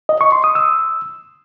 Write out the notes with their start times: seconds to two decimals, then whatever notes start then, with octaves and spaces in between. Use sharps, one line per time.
0.09 D#5
0.21 C#6
0.32 C6
0.44 D#6
0.55 E6